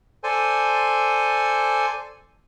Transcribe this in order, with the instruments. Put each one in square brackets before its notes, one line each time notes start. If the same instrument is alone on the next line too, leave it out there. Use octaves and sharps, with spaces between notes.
[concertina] A4 C5 D5 G#5